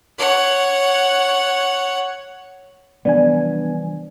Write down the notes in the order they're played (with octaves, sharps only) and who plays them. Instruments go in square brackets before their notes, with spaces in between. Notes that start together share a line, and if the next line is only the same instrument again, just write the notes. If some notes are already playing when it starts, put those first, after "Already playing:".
[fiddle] C#5 F#5
[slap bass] E3 F3 G3 [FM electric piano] B3 D4 G#5 [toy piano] D5